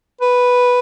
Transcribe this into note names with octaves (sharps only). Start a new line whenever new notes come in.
B4